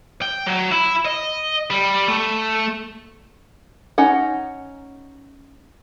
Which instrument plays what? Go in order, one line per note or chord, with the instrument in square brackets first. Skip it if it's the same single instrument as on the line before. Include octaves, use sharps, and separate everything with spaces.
[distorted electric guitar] G5
F#3
E4
D#5
G3
A3
[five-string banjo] C#4 D#4 F#5